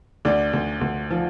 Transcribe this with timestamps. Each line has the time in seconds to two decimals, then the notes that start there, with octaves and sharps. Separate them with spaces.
0.25 D2 D4 D5
0.53 D2
0.81 D2
1.10 F3